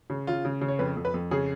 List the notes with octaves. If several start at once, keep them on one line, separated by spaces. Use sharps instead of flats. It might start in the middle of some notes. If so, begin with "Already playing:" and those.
C#3
C#3 F4
C#3
C#3
C#5
F2 B4
F2
B4
F2
C#3 G#4